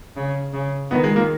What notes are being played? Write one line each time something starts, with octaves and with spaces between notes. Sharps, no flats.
C#3
C#3
D#3 B3
G#3
A#3